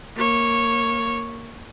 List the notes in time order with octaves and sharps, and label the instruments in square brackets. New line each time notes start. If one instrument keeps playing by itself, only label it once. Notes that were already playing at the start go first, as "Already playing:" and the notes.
[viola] A#3 C#5